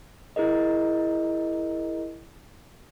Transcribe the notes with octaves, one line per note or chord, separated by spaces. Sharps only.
E4 G#4 A#4 D#5